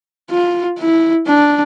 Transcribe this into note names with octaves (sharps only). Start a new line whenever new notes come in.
F4
E4
D4